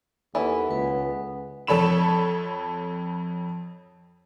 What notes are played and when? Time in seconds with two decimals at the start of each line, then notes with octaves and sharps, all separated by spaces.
0.35 D#2 E3 B3 C#4 E4 A4
0.71 C#2 B4
1.67 F2 A4 C#5 B5 E7